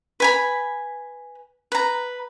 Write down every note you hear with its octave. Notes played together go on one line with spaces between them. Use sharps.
B4 G#5 B5
B4 A#5